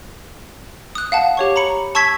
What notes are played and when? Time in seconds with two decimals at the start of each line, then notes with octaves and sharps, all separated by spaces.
0.95 D#6 F#6
1.12 F5 F#5 A5
1.37 G4 C#5 C#6
1.56 A#5 B5 C#7
1.95 A5 C#6 E6 G#6 B6